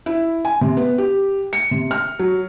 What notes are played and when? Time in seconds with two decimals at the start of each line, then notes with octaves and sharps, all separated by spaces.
0.06 E4
0.45 G#5
0.61 C3
0.77 B3
0.98 G4
1.53 C#7
1.71 C3
1.91 F6
2.19 F#3